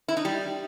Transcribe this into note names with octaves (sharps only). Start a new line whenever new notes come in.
E4
D#4
G3